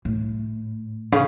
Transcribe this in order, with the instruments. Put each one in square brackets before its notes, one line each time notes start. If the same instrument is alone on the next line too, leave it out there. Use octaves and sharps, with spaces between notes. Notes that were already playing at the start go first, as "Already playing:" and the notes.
[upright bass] A2
C#3